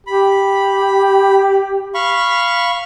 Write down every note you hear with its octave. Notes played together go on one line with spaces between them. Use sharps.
G4 B5
F5 B5 C#6